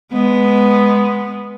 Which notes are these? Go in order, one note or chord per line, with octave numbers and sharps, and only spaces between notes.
G#3 B3